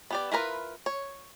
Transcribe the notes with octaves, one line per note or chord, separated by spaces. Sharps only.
B3 G4 D5
E4 F4 A#4 B4
C#5